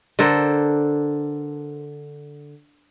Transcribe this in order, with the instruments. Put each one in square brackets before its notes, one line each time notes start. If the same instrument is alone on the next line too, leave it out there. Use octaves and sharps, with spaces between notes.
[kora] D3 A4 A#4 C5